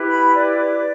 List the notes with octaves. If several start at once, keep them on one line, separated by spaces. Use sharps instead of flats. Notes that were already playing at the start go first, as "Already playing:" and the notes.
Already playing: E4 G4 B4
B5
D5